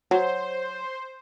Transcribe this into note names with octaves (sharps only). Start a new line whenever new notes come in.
F#3 C5